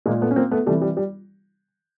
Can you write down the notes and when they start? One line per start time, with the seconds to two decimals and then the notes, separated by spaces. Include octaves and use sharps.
0.06 A#2 G#3 A#3
0.21 A3 B3
0.31 C#4
0.36 A#3 C4
0.51 A3 B3
0.66 C3 E3 G3 A3
0.82 G3
0.97 G3